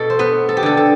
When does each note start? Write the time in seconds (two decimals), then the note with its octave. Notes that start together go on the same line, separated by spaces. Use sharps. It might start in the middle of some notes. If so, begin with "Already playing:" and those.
Already playing: B2 A4
0.10 C5
0.19 B3 B4
0.49 A4
0.57 G4
0.63 D3 A4
0.77 A4